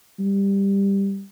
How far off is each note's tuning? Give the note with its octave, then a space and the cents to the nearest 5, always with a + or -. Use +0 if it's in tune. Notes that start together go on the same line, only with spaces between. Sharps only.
G3 +10